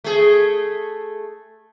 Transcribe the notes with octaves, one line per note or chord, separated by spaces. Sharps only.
A3 G#4